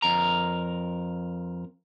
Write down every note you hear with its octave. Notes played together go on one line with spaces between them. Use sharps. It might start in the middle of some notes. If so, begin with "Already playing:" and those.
F2 A#4 A#5